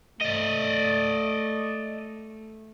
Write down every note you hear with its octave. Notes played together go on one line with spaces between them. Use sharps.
A3 D5 D#5